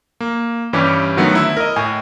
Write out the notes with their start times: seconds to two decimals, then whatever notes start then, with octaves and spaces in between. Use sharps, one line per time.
0.20 A#3
0.73 G2 E3 G3 C#4 G4
1.17 D3 D#3 F#3 A3 B3
1.35 E4 E6
1.57 A#4 D#5
1.76 A2 G#5